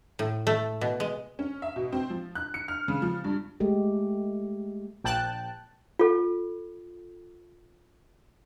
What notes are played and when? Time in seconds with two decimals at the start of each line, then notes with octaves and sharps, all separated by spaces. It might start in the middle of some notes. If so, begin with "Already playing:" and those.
0.19 A2
0.47 A3
0.81 B2
1.00 G#3
1.39 C#4
1.62 E5
1.76 B2
1.92 C4
2.10 F3
2.35 F#6
2.54 C#7
2.68 F6
2.88 C#3
3.02 F3
3.24 G2
3.60 G#3 A3 G4
5.04 A#1 G5 A5 F#6
5.99 F4 A4